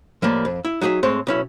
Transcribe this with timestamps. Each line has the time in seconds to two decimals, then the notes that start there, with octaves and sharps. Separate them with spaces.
0.22 A2 F3 G3 A#3
0.45 F2
0.65 E4
0.81 F#3 D#4 G#4 D5 E5
1.03 A2 G#3 C4 C5 C#5
1.27 B1 C#4 E4